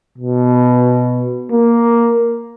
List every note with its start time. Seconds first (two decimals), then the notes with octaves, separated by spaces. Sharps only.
0.18 B2
1.52 A#3